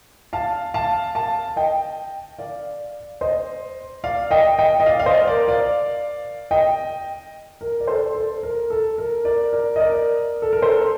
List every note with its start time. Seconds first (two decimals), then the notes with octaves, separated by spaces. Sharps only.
0.33 F5 A5
0.74 F5 A5
1.15 F5 A5
1.56 D#5 G5
2.39 D5 F5
3.21 C5 D#5
4.04 D5 F5
4.31 D#5 G5
4.59 D#5 G5
4.80 D#5
4.86 D5 F5
5.00 F5
5.06 C5 D#5
5.27 A#4 D5
5.48 D5 F5
6.51 D#5 G5
7.61 A#4
7.80 D5
7.87 A4 C5
8.15 A4
8.43 A#4
8.70 A4
8.98 A#4
9.25 A#4 D5
9.53 A#4 D5
9.76 D#5
9.80 A#4 D5
10.42 A4
10.53 A#4
10.62 A4 C5